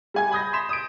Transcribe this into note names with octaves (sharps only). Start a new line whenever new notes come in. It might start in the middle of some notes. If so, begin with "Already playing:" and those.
G3 G#5 G#6
B5 D#6 G6 A#6
C6 B6 E7
D#6 D7